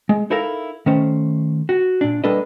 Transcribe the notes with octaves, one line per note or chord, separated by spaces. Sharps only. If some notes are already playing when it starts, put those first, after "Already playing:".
G#3
D#4 E4 A4 A#4 F5
D#3 A3 C#4 C5
F#4
A#2 D4
G3 A#3 D4 A4 B4 D#5